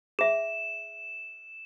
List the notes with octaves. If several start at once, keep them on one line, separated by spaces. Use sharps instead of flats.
G#4 E5 E7